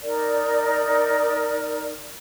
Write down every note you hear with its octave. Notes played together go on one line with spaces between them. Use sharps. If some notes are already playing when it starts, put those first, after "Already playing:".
D#4 A#4 D5